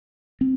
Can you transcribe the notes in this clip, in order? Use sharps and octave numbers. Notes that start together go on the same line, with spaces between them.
C4